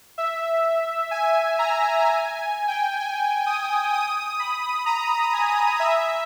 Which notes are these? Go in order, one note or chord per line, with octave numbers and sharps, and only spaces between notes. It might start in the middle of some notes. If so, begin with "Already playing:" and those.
E5
G#5
A#5
G#5
G#5
G5
G#5
D#6
D#6
B5
A#5
G#5
E5